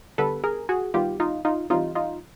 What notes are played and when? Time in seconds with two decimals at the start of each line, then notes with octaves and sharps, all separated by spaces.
0.18 D3 G3 B3 A4 B4
0.44 G#4 A#4
0.69 F#4 G#4
0.94 D#3 G3 B3 F4 G4
1.20 D#4 F4
1.45 D#4 F4
1.70 E3 G3 C4 D#4 F4
1.95 D#4 F4